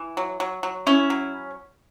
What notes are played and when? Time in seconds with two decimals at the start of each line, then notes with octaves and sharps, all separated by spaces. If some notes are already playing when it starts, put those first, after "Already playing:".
Already playing: E3
0.17 F#3
0.40 F#3
0.63 F#3
0.87 C#4 E4
1.10 F#3